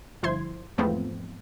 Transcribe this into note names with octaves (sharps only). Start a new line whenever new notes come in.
G1 F3 E4 C5 C6 G#6
E2 G#2 F3 A3 B3 C4